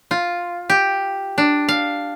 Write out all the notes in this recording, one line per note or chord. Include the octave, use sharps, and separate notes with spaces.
F4
G4
D4
F5